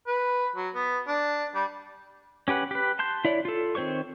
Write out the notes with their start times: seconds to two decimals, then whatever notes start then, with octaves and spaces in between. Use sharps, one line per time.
0.07 B4
0.56 F#3
0.75 B3
1.08 D4
1.55 G3
2.48 C#4 G4 B4 F#5
2.71 G4 B4
2.99 A5 C6 G6
3.25 E4 C#5 D5
3.45 F4 A4
3.75 D#3 C4 C5 C#5 C#6